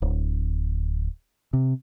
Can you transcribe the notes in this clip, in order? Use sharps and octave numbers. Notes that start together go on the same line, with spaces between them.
D1
C3